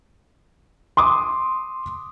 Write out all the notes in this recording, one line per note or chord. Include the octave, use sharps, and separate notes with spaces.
C6 D6 D#6